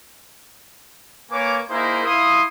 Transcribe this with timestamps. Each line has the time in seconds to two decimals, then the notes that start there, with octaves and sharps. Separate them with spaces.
1.32 A#3 B4 C#5 G#5 D6
1.70 A#3 D#4 E4 G#4 A#4 C5
2.05 E4 F5 C6 D#6